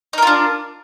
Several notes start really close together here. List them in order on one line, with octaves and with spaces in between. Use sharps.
D#4 A#4 F4 D4